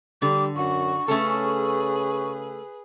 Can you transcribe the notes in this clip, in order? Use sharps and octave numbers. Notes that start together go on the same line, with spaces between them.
D3 G3 D6
F#2 F#4 C#6
C#3 A3 C#4 G#4 A4 B4